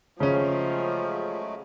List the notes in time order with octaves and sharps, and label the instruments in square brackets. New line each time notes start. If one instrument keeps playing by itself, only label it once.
[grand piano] C#3 C#4 [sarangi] F3 [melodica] F#3 G#3 A3